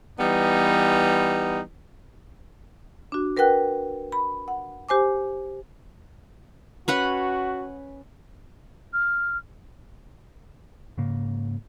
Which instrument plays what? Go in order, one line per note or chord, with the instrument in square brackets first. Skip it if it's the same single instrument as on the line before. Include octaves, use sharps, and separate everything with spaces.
[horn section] E3 G3 B3 D#4
[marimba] D4 F#4
A#4 B4 F#5 G5 F#6
B5
F#5
G4 C5 G#5 D6
[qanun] C#4 B4 F#5 [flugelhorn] F#4
[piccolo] F6
[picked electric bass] G#2 C#3 A#3